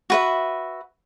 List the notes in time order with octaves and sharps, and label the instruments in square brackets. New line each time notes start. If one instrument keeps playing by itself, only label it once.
[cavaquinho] F#4 B4 E5